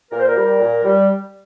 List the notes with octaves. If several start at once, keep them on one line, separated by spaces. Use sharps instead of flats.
A#2 A#4
C5
A#4
G3
A#2
G3